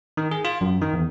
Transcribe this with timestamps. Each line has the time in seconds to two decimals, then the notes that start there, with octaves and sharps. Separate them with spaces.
0.17 D#3
0.31 G#4
0.45 F4
0.61 F#2
0.81 D#3
0.93 E2